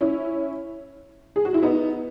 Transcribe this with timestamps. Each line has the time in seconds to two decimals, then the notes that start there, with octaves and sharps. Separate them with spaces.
0.01 C#4 E4
1.36 G#4
1.45 F#4
1.54 E4
1.63 B3 D#4